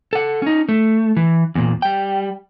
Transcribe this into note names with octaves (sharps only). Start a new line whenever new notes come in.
A4 F#5
C#4 D#4
A3
E3
E2 A#2
G3 G5